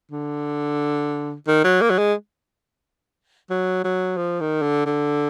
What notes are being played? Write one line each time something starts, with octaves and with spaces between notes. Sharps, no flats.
D3
D#3
F#3
A#3
F#3
G#3
F#3
F#3
F3
D#3
D3
D3